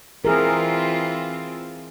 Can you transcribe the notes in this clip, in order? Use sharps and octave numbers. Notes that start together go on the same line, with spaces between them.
E3 C4 F4 G#4 A#4